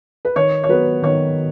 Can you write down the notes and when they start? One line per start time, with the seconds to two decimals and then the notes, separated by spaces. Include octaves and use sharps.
0.25 B4
0.36 D#3 C#5
0.64 C#5
0.69 F#3 B3 B4
1.02 D#3 C#5